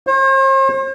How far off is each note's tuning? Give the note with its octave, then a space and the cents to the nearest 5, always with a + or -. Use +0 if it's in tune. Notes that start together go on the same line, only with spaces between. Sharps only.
C5 +45